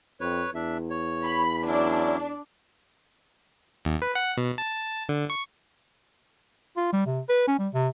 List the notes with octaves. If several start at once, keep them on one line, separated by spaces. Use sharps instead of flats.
F2 B4 C#5
E2 D4 E5
C#5
B5
F#3 C#4 D4 E4
D#2
B4
F#5
B2
A5
D3
C#6
F4
G3
C3
B4
C#4
G3
C3